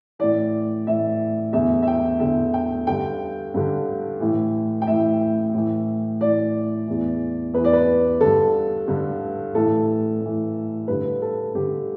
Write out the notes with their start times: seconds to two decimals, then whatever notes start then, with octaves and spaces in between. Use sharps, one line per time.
0.19 A2 E3 D5
0.87 A2 E3 E5
1.53 E2 D3 E5
1.83 E5
1.87 G5
2.20 E2 D3 E5
2.54 G5
2.87 G2 D3 G5
3.54 G2 D3
4.21 A2 E3
4.82 G5
4.87 A2 E3 E5
5.54 A2 E3
6.21 A2 E3 D5
6.88 E2 E3
7.54 E2 E3 B4
7.64 D5
7.73 B4
8.21 G2 D3 A4
8.88 G2 D3
9.55 A2 E3 A4
10.21 A2 E3
10.88 G2 D3 B4
11.22 A4
11.55 G2 D3 G4